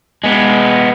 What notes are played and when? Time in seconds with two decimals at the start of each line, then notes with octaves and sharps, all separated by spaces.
0.24 G#3 B3